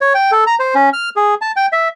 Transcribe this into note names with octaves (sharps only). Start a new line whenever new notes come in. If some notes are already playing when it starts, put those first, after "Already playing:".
C#5
G5
A4
A#5
C5
C#4
F6
G#4
A5
G5
E5